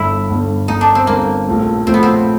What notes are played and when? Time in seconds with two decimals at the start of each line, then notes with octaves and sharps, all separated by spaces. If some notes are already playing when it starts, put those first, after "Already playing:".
Already playing: G1 G2 D3 E4
0.30 G1 G2 D3
0.68 G1 G2 D3 D#4
0.81 D4
0.95 C4
1.07 G1 G2 D3 A#3
1.47 A#1 A2 F3 A3
1.87 A#1 A2 F3 A3 C4
1.94 B3
2.03 C4